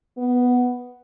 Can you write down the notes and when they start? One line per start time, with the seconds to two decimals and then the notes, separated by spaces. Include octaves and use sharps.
0.18 B3